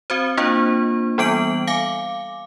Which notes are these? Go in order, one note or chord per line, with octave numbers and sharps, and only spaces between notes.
C4 F#4 C5
A#3 D4 F4 C5
E3 G3 B3 G#5 D7 F#7
F5 G#5 D6